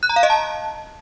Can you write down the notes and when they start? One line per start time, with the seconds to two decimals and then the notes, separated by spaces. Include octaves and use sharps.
0.03 F#6
0.09 A#5
0.16 F5
0.23 D#5
0.30 A5